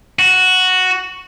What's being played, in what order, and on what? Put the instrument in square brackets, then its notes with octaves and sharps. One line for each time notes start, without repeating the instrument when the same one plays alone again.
[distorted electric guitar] F#4